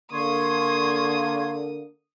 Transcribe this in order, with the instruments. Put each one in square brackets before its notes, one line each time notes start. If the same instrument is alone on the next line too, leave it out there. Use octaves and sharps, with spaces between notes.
[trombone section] D3 A#3 [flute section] C6 C#6 G#6 [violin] D#6